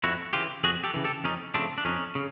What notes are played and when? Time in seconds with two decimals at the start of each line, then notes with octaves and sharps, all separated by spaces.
0.04 F2 E4 F#4
0.33 C#3 E3 F4 G4
0.64 F2 F#4 G#4
0.84 G4 A4
0.94 C#3 E3
1.04 G4 A4
1.24 F2 C#4 D#4
1.54 C#3 F3 A3 C4 D4
1.78 D4
1.85 F2 C#4 D#4
2.15 C#3